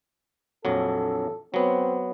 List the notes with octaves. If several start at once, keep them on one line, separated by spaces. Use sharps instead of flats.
A#1 F2 F#3 A4
F#3 B3 C4